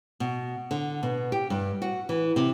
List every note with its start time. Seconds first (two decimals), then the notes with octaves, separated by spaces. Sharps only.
0.20 B2
0.71 D3
1.03 B2
1.32 G4
1.50 G2
1.82 F#4
2.09 E3
2.36 C3